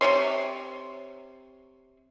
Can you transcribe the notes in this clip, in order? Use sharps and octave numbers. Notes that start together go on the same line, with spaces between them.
C3 D4 C#5 C6